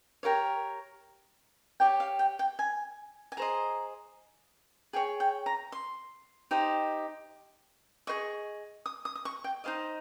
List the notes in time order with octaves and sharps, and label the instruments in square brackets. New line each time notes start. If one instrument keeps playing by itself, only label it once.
[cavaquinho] G4 A#4 C#5 F5
G4 C#5 G5
F5
G5
G5
G#5
G#5
G#4 C5 D#5 A#5
G#4 C#5 G5
G5
A#5
C6
D#4 G4 C5 D#5
G#4 C5 D#5 C#6
D#6
D#6
D#6
C#6
G5
D#4 G#4 C5 D#5 F5